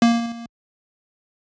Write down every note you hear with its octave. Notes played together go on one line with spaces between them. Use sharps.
A#3